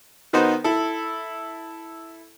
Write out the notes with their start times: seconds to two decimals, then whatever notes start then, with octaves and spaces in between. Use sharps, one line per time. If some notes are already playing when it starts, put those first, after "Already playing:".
0.33 D#3 B3 D#4 F#4 C5
0.64 E4 A4